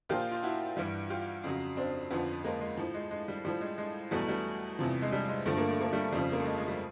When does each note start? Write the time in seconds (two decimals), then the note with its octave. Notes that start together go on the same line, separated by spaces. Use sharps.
0.09 A#2 F3 F4 G4
0.31 F4
0.43 E4 F#4
0.77 G2 E3 G3
1.10 F4 G4
1.44 F2 C#3 F#3
1.77 C4 D4
2.10 F2 D3 F3 B3 C#4
2.44 G#3 A#3
2.61 G#3
2.78 A2 F3
2.94 G#3
3.11 G#3
3.28 G3
3.44 A2 F3 G3
3.61 G#3
3.78 G#3
4.11 E2 B2 F#3 G3 A3
4.29 G3 A3
4.79 E2 C3 F3
5.02 G#3
5.12 G3
5.29 G#3
5.46 G2 D3 F3 A3
5.57 A#3
5.69 A3
5.81 A#3
5.92 G3 A3
6.12 F2 C#3 F3 G3
6.32 A#3
6.39 A3
6.46 G#3
6.58 G#3
6.68 G3